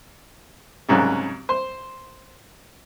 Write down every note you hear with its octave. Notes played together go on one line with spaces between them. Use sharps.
C2 G#2 C#3 F#3
C5